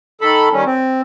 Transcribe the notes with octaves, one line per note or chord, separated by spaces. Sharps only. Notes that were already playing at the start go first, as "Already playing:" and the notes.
D#3 A4 B5
D#3 G3 C#4
C4